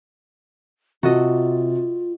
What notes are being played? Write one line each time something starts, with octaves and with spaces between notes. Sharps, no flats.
C3 F4 F#4 A4 D#5